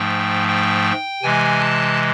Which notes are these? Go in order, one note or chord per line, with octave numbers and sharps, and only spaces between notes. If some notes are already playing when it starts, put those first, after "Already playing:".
Already playing: G#2 F3 A3 G5
G5
C3 E3 G#3 G#5
A5